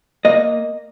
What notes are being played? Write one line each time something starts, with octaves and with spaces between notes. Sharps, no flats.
A#3 D#5